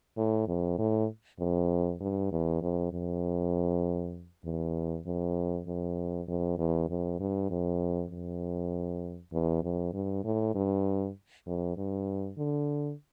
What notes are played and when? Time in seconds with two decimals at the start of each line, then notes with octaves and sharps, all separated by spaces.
0.17 A2
0.48 F2
0.79 A2
1.40 F2
2.00 G2
2.32 E2
2.62 F2
2.92 F2
4.44 E2
5.06 F2
5.67 F2
6.28 F2
6.58 E2
6.89 F2
7.20 G2
7.50 F2
8.11 F2
9.33 E2
9.63 F2
9.93 G2
10.24 A2
10.55 G2
11.46 F2
11.77 G2
12.38 D3